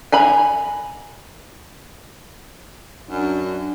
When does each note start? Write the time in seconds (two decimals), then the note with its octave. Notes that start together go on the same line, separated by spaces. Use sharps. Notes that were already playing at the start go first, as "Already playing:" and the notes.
0.12 G#5 A#5 B5
3.09 F#2 D4